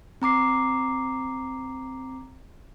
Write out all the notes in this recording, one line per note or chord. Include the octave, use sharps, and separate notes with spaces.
C4 A#5 D6 C7